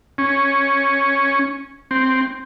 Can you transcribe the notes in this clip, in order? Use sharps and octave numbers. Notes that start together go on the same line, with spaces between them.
C#4
C4